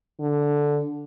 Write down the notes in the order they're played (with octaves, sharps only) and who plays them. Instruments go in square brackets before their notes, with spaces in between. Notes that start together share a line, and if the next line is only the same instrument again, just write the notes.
[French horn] D3